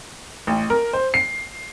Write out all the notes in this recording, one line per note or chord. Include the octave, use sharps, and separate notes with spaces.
A1
A#4
C5
C7